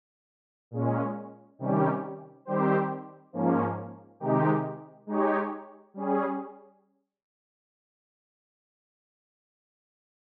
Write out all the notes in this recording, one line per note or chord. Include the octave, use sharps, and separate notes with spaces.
A#2 G#3 C#4
C3 D#3 G3 C#4 G4
D#3 G3 C4 G4 C5
G#2 F3 A#3 C#4
C3 D#3 G#3 D#4 G4
G#3 D#4 G4 C#5
G3 C#4 G#4